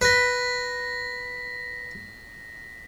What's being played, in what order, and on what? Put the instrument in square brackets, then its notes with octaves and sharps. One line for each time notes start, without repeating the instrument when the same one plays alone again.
[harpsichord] B4 [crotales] A#6 B6